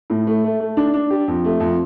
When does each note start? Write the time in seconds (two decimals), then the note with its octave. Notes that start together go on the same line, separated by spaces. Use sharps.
0.10 A2
0.27 A3
0.44 A3
0.60 A3
0.77 D4
0.94 D4
1.10 G4
1.28 F2
1.45 A3
1.60 F2